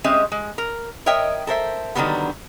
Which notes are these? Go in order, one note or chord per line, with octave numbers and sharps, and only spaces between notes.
G#3 C4 C#4 G4 D#5 E5
G#3
A#4
A#4 C#5 D#5 E5 G5
A4 A#4 C5 E5
D3 D#3 F#3 G3 A#3 B3